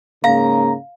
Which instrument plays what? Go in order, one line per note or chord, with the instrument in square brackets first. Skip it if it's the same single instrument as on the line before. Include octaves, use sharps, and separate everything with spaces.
[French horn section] G#2 C#3 A#3 [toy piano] F5 [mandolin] A#5